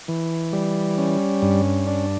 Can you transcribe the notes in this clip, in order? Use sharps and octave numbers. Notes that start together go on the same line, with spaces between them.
E3
G3
C#4
G2
D4